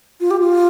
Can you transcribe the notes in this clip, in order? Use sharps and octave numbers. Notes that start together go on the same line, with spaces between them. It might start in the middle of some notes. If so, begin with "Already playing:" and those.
F4
G4
F4